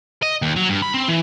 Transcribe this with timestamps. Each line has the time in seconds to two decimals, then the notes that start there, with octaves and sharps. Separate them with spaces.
0.23 D#5
0.42 D#2
0.56 F#3
0.69 G2
0.82 B5
0.94 C4
1.08 E3